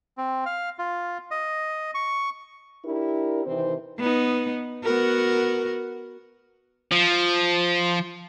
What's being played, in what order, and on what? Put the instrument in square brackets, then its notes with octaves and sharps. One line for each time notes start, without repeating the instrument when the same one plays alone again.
[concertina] C4
F5
F4
D#5
C#6
[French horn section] D4 E4 G4 A#4
C3 D#3 E3 C4 C5
[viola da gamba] B3 D#4
B3 F#4 A#4
[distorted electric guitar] F3